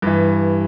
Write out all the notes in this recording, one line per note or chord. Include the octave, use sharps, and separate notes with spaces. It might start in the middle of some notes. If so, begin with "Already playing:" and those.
G2 E3